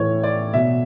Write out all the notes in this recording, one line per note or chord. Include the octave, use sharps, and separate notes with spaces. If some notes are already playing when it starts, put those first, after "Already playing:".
Already playing: A2 E3 C#5
D5
B2 E5